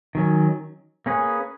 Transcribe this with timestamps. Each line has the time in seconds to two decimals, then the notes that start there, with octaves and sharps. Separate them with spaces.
0.15 D#3 F#3 C#4
1.06 A#3 C#4 G#4 B4